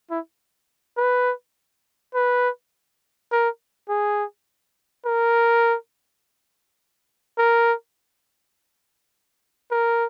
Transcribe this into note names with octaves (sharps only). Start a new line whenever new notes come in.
E4
B4
B4
A#4
G#4
A#4
A#4
A#4